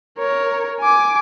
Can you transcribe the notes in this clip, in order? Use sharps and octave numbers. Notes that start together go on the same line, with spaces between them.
A#4 C#5
G#5 D6